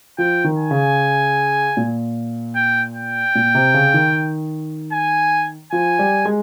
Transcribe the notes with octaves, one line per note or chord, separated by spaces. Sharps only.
F3 G5
D#3
G#5
C#3
A#2
G5
G5
A#2
C3
C#3
D#3
G#5
F3 G#5
G3
G#3